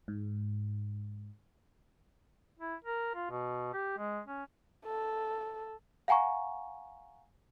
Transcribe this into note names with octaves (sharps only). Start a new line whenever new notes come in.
G#2
E4
A#4
F4
B2
G4
G#3
C#4
A4
F5 F#5 G#5 A#5 C#6